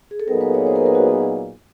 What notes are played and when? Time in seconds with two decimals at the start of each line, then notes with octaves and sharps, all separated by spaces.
0.11 G#4
0.20 A4
0.28 A#2 F#3 B3 D#4 G#4 A#4
0.41 B4
0.54 C#5
0.67 C5
0.76 A#4
0.86 A#4
0.95 F#4